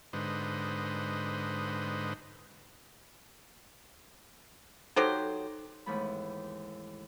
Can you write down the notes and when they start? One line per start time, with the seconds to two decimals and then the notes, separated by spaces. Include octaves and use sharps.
0.13 G#2 D3 B4 C5 D#5
4.96 F#3 D#4 G4 A4 C5 D6
5.86 D#2 G#2 E3 A3 B3 B5